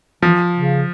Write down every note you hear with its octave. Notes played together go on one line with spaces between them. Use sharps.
E3 F3
C#3